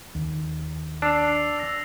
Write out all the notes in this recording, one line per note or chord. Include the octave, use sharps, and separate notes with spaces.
D#2
D4 E6 C7 F7
E6 A#6